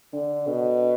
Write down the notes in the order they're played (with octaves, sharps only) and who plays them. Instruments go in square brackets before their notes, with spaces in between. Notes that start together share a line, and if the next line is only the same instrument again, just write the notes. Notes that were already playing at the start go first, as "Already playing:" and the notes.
[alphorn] D3 [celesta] D4 A4 D5
[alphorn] B2 [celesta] D4 A4 D5
[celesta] D4